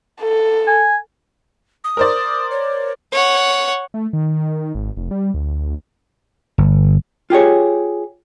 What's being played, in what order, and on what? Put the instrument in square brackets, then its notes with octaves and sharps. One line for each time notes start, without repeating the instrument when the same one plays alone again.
[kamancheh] A4
[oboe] G#5
[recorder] D#6
[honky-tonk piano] A#4 C5 D5
[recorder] C#5
[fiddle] C#5 F#5
[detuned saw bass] A3
D#3
G#1
F1
G3
D2
[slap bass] G1
[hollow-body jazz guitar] F4 G4 G#4 C#5